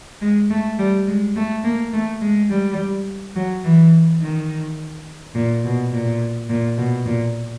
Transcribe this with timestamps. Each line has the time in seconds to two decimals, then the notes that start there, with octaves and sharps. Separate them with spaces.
0.22 G#3
0.51 A3
0.79 G3
1.08 G#3
1.36 A3
1.64 A#3
1.93 A3
2.22 G#3
2.50 G3
3.36 F#3
3.64 E3
4.21 D#3
5.35 A#2
5.64 B2
5.93 A#2
6.49 A#2
6.78 B2
7.06 A#2